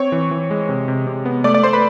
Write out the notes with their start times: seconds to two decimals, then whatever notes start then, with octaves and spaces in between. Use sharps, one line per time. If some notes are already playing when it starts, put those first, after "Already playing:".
Already playing: C4 C#5 C#6
0.12 E3
0.31 E3
0.51 G#3
0.69 C3
0.88 C3
1.07 C3
1.25 B3
1.44 A3 D5 D6
1.54 D5 D6
1.63 A3 C5 C6
1.73 B4 B5